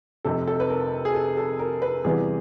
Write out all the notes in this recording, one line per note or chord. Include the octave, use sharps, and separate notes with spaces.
F1 F2 C3 A4
A4
B4
A#4
G#4
A4
A4
A#4
B4
E2 C3 E3 G3 B3 G#4